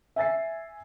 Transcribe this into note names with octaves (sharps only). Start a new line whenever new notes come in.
E5 G#5 A6 C7